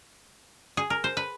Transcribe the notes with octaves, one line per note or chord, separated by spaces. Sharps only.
G#4
A#4
C5
B4